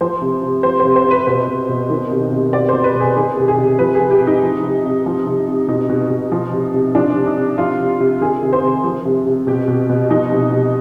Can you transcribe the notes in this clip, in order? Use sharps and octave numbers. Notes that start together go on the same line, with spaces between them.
F3 C5
C3
C3
F3 C5
C5
C3
C5
C3 B4
B2 C5
B2
B2
D#3
C3
C3
B2 D5
B2 C5
B4
B2 G#4
D#3 G#4
C3 G4
G#4
C3
F3 B4
G#4
C3
G4
C3
D#4
F3
C3
C3
F3
C3
C3
B2 D#4
B2
B2
F3
C3
C3
F3 D4
C3
D#4
C3
F3 F4
C3
C3
D#3 G#4
C3
C5
C3
F3
C3
C3
B2 G4
B2
B2
F3 D#4
C3
C3